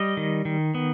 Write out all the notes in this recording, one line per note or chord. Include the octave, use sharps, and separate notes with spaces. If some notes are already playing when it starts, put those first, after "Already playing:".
Already playing: G3 D#5
D#3
D#3
B3